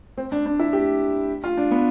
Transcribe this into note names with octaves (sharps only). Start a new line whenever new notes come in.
C4
D4
D4
E4
G4
F4
D4
B3